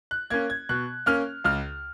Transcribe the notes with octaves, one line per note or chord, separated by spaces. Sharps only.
F#6
A#3 C#4 G#6
G#6
B2 F#6
A#3 C#4 F6
C#2 F6